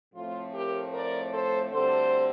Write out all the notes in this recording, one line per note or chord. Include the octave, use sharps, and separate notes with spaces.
A2 F3 A3 C4 F4
G4 A#4
A#4 D5
A4 C5
D2 D3 G3 C4 A4 C5